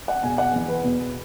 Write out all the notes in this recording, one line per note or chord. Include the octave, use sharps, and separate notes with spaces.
F#5
E2 B2 G#5
F#5
E2 E3
B4
E2 B2